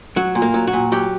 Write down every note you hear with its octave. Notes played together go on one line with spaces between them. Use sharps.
F#3 F#4
A#2
A#3
F#3
F#4
A#2
F#3 G4